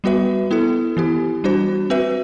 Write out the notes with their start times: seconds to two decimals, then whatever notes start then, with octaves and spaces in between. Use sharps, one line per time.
0.04 G3 B3 F#4 B4 E5
0.51 B3 E4 A4
0.97 E3 B3 E4 G4
1.44 G3 D4 F#4 C5
1.90 C4 F#4 B4 E5